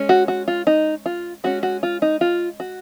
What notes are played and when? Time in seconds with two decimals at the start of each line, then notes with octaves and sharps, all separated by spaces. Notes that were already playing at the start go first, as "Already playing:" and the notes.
Already playing: G#3 C#4
0.09 F#4
0.28 F#4
0.48 F4
0.67 D#4
1.06 F4
1.44 G#3 C#4 F#4
1.63 F#4
1.83 F4
2.02 D#4
2.21 F4
2.60 F#4